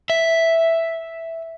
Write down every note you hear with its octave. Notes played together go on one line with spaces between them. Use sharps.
E5